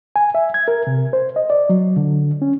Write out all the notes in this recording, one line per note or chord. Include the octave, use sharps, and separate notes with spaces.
G#5
E5
G#6
A#4
C3
C5
D#5
D5
F#3
D3
C#4